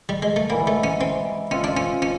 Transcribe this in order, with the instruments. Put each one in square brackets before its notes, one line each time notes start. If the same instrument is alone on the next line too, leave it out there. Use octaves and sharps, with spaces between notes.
[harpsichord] G3
G#3
A3
[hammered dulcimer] G#2 E3 G3 [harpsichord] A#3
[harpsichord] A3
C#4
C4
[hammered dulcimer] G#3 C4 F4 A4 [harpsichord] C#4
[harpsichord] D4
C#4
C#4